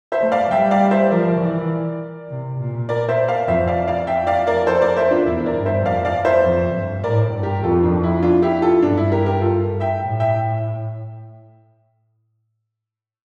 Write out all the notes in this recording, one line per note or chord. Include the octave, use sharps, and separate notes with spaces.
C5 E5
A3
D5 F5
G3 E5 G5
D5 F5
C5 E5
F3 A#4 D5
E3
C3
A#2
A#4 D5
C5 E5
D5 F5
F2 C5 E5
D5 F5
D5 F5
F2 E5 G5
D5 F5
A#4 D5
A4 C5
A#4 D5
C5 E5
D4 F4
E2 E4
A#4 D5
G2
C5 E5
F2 D5 F5
D5 F5
C5 E5
F2
G2
A2 A#4 D5
G2
G4 A#4
F2 F4 A4
D4
E4
D4 F4
E4 G4
F4 A4
G2 D4
E4
G4 A#4
G4 A#4
F4 A4
E5 G5
A2
E5 G5